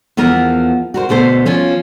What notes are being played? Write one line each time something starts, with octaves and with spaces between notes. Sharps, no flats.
E2 F3 B3 A#4
F#4 A#4 C5
D2 B2 A4 C5
F3 C#4 F4